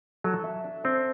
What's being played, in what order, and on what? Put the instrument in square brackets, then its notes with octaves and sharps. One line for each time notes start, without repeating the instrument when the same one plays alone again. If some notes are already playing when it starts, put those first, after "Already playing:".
[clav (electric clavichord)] F#3 [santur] A4
[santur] E5
D4
[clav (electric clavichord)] C4 [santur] D4